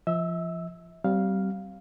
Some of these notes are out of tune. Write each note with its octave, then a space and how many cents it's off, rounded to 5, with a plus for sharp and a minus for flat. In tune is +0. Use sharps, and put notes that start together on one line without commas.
F3 -25 E5 -40 E6 +0
G3 -30 C4 +0 F5 +0